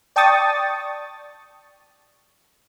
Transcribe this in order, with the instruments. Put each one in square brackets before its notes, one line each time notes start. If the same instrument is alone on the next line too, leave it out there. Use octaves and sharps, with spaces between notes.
[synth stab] D5 G5 A5 C#6 D#6 A6